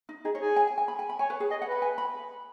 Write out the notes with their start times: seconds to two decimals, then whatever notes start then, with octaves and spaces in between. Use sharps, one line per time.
0.09 D#4
0.25 D#4 G#4
0.35 C#5
0.41 G#4
0.56 G#5
0.67 G#5
0.78 G#5
0.88 B5
0.99 G#5
1.09 B5
1.19 C#5 G#5
1.30 B4
1.40 G#4
1.50 D#5 G#5
1.62 F#5
1.67 B4 B5
1.82 G#5
1.98 B5